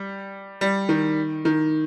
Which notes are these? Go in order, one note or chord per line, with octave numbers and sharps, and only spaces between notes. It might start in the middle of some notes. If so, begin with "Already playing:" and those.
Already playing: G3
G3
D#3
D#3